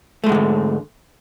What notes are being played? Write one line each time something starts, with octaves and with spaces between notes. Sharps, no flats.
G#2 D3 D#3 G#3 A3